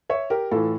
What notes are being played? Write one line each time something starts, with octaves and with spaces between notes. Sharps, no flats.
C#5 E5
G4 A#4
A2 E3 F4 A4